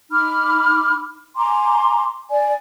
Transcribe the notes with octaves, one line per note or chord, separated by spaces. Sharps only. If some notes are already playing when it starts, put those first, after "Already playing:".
D#4 B5 D6 F6
G#5 A#5 C6 D6
D5 G#5